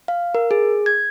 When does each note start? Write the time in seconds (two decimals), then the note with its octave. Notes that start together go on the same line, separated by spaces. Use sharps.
0.08 F5
0.35 A#4
0.51 G#4
0.86 G#6